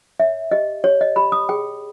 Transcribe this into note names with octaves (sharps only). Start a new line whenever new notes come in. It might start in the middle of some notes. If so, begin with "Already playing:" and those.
C#5 E5
G4 D#5
G4 C#5
D#5
G4 B5
D#6
G#4 G5